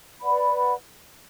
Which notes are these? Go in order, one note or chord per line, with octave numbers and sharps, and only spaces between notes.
B4 D5 F#5 B5